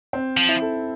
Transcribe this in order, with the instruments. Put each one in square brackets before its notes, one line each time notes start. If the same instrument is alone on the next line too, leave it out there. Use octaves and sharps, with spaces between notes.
[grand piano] C4
[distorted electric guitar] F3
[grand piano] E4
A4